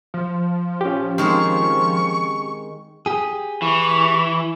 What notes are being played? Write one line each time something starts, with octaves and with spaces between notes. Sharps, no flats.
F3
C#4 G4
D#3 G#3 C4 C#6
G4 G#4
E3 C#6